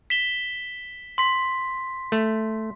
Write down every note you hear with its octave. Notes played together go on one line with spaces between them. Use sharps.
B6 E7 G7
C6 B6
A3